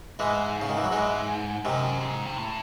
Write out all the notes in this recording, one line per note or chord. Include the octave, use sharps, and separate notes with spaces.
G#2 E3 G#3
C#3
D#3
E3
F#3
G#2 E3 G#3
F#2 C3 D#3
G#2
C3
A2